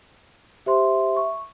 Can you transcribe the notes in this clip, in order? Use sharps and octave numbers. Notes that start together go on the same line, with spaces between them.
G4 C5 E5 C6
C#6